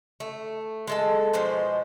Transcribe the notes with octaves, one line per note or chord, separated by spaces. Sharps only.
A3
G#3 A4 A5
B2 F3 G#3 C5